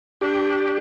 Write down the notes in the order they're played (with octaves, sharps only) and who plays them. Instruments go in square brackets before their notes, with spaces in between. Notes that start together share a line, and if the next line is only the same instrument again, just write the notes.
[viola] D4 [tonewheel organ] G4